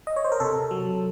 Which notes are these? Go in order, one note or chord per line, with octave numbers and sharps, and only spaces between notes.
D#5
C#5
C5
A#4
C3 A4
F#3